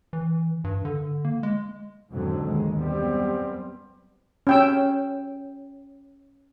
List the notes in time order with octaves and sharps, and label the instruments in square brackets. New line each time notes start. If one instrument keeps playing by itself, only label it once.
[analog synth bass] E3
G2
D3
A#3
G#3
[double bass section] F2 G#2 B2 D3 F#3
D#2 G#3
F#2 G3 B3 C4
[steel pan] C#4 G5 E6